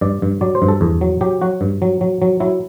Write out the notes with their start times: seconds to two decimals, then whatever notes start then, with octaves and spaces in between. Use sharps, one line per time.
0.01 G2 D5
0.22 G2
0.41 F#3 D5
0.55 C5
0.62 G2
0.68 A4
0.81 E2
1.01 F#3
1.21 F#3 G4
1.41 F#3 F#4
1.61 G2
1.82 F#3
2.01 F#3
2.22 F#3
2.40 F#3 E4